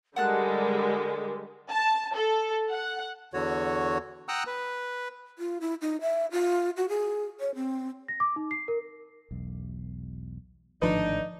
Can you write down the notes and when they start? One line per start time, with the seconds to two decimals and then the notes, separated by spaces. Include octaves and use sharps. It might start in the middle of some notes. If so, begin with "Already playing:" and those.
0.16 D3 G3 G#3 A#4 F#5 A5 F#6
1.71 A5
2.17 A4
2.71 F#5
3.34 E2 D3 F#4 C#5
4.28 F#5 G5 A#5 D#6 E6 F#6
4.47 B4
5.39 F4
5.61 E4
5.82 D#4
6.01 E5
6.32 F4
6.77 F#4
6.89 G#4
7.40 C#5
7.55 C4
8.08 A#6
8.20 D6
8.36 D#4
8.51 C7
8.68 A#4
9.31 E1 B1
10.82 G#1 A2 D3 F3 D4 D#4 B4